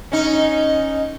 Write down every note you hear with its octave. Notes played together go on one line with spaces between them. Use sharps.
C#4 D#4